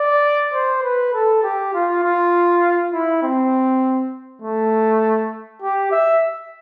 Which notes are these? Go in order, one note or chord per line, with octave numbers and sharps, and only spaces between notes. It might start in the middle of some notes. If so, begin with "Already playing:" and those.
Already playing: D5
C5
B4
A4
G4
F4
F4
E4
C4
A3
G4
E5